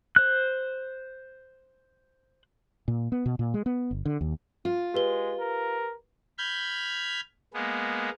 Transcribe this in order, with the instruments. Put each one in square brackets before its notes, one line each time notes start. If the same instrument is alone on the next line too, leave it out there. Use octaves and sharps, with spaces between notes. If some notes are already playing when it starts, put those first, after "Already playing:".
[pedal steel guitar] C5 F#6
[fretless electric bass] A#2
B3
B2
A#2
G#3
B3
G1
D3
D#2
[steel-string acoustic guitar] F4
[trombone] G#3 [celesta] G4 B4 G7
[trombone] A#4
[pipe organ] B5 F6 G6 G#6
G#3 A#3 B3